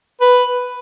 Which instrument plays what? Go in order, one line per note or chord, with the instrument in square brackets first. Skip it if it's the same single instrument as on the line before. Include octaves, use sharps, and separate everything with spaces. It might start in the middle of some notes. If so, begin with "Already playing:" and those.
[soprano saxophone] B4